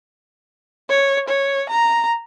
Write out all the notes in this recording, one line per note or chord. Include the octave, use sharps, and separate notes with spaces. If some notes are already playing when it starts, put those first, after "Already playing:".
C#5
C#5
A#5